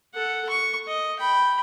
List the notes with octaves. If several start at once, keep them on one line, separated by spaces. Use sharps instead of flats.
A4 F#5
C#6
D#5
G5 B5